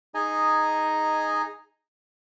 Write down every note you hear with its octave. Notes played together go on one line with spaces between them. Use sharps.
D#4 G#4 D#5 G#5 A#5